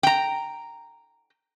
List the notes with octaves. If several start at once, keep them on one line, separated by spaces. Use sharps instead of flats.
G5 A#5